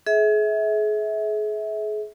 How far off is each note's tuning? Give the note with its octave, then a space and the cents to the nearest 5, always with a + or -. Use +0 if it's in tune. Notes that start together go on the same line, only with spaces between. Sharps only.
G#4 +35 E5 -25